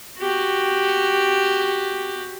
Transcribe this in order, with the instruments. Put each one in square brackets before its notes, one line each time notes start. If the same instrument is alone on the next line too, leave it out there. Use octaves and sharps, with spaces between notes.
[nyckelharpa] F#4 G4